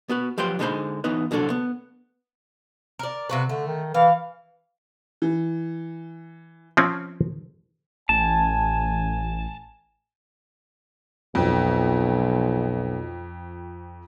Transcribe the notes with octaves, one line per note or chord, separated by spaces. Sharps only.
B3 F#4 B4
F3 F#3 G4 B4 G5 C6
D3 G#3 D4 D#4 C5 B5
E3 B3 D#4 B4
C2 D3 F#3 D4 A4
B3
A#4 D5
C3 F#4 B4
D3 A3
D#3
E3 F5
E3
F3 C4 C#4
A1 G#5 A5
B1 F2